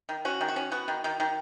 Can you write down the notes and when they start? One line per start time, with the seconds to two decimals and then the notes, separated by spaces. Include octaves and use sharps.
0.09 D#3
0.25 C#4 F#4
0.41 D#3
0.48 F#4
0.56 C#4
0.72 B3 F#4
0.88 D#3
1.04 D#3
1.20 D#3